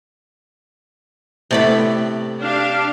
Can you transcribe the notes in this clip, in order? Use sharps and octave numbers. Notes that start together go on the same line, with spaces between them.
A2 C3 A3 B3 D5 B5
D4 G4 F5